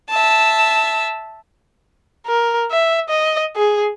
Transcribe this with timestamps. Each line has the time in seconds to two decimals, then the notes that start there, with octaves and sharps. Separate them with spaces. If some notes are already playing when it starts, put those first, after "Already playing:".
0.10 E5 A5
2.27 A#4
2.71 E5
3.09 D#5
3.56 G#4